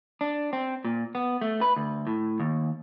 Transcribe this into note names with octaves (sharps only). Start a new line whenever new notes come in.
D4
C4
A#2
B3
A3
B4
D2
A2
D#2